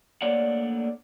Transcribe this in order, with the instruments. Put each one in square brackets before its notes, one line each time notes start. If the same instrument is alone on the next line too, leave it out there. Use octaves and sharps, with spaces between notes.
[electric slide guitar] A3 A#3 D4 C#5 D5 F#5